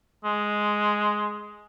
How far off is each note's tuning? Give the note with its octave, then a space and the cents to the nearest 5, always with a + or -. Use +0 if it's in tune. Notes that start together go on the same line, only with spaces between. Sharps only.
G#3 +5